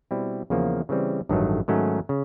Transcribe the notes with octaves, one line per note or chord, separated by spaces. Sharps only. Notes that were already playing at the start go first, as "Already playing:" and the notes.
B2 G3 C4 E4
E2 C#3 F3 A#3
C#3 E3 G3 C4
A1 G2 D#3 F#3 A3
G#2 D#3 F#3 A3 C#4
C#3